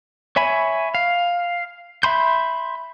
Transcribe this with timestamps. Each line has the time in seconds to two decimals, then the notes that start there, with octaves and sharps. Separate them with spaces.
0.36 C#5 E5 G#5 B5
0.95 F5
2.03 E5 B5 C6 G6